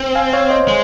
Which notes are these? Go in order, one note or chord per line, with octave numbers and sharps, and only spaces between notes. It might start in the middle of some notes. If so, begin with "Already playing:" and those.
Already playing: C4
F5 G#5
C#5 F5
C5 D#5
G#3